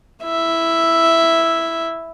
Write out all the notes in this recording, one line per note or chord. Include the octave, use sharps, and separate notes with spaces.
E4 E5